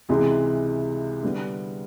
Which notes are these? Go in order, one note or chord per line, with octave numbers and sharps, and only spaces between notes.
C#2 C3 E3 G#3
D3 G3 B3